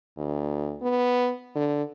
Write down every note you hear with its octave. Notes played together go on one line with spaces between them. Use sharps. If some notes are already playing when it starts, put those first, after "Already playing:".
D2
B3
D3